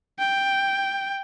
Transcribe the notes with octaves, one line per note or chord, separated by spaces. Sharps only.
G5